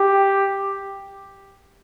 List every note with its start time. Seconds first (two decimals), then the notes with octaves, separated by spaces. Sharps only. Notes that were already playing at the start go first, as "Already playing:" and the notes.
Already playing: G4